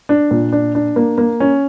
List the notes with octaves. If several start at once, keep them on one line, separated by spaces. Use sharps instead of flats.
D4
A#2
D4
D4
A#3
A#3
C#4